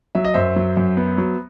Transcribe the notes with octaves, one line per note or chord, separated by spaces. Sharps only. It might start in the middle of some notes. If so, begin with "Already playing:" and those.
F#3 E5
D#5
F#2 C5 E5
F#3
F#2
B3
F#3